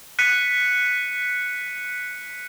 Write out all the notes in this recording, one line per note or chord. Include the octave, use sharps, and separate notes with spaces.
F#6 B6 C#7 D#7